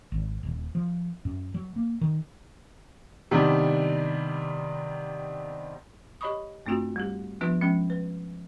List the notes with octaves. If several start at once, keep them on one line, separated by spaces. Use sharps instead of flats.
G#1
D#1
F3
F#2
F#3
A#3
D#3
C3 D#3 G3 B3 D4
G4 C#5 D#5 B5 C#6 D#6
G2 A3 C4 D4 F4 F#4
G3 G4
F3 B3 D4 F4 B4
F3 G#3 C#4
B4